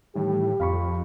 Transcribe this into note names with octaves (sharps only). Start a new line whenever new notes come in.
A2 D#3 E3 G3 G4
F2 F5 B5 C#6